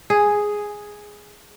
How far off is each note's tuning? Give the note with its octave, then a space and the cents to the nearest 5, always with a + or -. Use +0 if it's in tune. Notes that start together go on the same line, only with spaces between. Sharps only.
G#4 +0